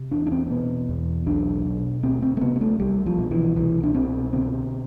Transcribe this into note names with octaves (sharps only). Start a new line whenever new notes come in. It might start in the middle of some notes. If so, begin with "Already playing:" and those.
Already playing: C3
E2 D4
D4
C4
C4
B2 B3
E2
B1 D4
B2
D2 C4
C4
A3
C3 B3
B3
A3
C2 G3
F3
B2
E3
C2 E3
D4
B2 C4
D3 C4